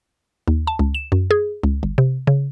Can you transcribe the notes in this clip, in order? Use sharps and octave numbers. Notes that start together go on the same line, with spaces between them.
D#2
A5
C#2
E7
F#2
G#4
C#2
G1
C3
C#3